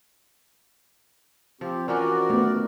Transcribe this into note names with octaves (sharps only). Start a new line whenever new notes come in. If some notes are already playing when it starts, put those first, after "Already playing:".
F3 C4 G4
E3 F3 C#4 F#4 A#4 D5
D#3 A3 B3